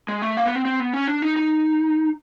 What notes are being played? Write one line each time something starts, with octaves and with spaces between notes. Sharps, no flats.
G#3
A3
A#3
B3
C4
C4
B3
C#4
D4
D#4
D#4